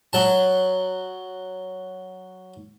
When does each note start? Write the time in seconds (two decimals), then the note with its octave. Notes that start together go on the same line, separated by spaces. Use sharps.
0.13 F#3 A5